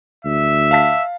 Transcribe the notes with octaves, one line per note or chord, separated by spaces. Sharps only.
D2 E5
F5 A5 B6